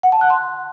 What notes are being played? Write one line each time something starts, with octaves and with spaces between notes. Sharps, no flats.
F#5
A5
F#6
C6